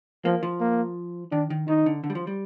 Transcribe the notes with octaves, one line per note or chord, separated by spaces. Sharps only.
F3 A#3
F3
A#3
D#3 D4
D#3
D#3 D#4
D3
D3
G3
F3
G3